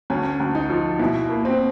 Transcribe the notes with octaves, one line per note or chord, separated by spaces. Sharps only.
D2 C#4
D2
D#4
F3
B2 E4
A#3
C4